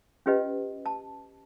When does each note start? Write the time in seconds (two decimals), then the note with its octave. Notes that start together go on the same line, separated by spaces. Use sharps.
0.26 C#4 F4 G4 B4 D#5
0.86 A5